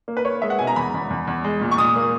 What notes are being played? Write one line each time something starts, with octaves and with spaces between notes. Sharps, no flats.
A#3
B4
A#3 C#5
G#3 E5
F#5
B2 G#5
A#5
E2 B5
E2
E2
E2
G#3
A#2
C#6
A#2 D#6
A#3